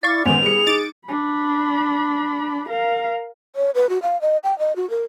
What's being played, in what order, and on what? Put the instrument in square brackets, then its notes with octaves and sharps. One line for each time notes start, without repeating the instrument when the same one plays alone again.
[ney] E4 [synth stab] D5 F5 C#6 [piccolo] A6
[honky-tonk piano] A1 G#3 C5 [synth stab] D#3 B3 [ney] G#5 [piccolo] F7
[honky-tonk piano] G3 C#7 [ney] G#4
[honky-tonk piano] D#4 [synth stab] D6 A6 D7
[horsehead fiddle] D4 B5
A#4 F5
[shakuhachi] C#5
B4
F#4
F5
D#5
G5
D#5
F#4
A#4